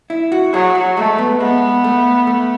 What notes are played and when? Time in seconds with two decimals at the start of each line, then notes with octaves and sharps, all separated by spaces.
0.10 E4
0.32 F#4
0.53 F#3 G#4
0.75 F#4
0.97 G#3 A3
1.18 B3
1.40 G#3 B3
1.84 A3
2.27 A3